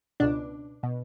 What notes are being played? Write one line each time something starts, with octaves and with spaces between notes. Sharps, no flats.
C#2 B2 D4
B2